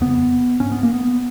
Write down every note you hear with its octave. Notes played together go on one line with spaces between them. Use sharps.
F2 C#3 B3
G#2 C#4
B3
A#3
B3